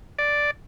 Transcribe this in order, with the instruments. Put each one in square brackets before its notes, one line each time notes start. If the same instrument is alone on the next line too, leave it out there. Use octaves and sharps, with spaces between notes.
[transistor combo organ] D5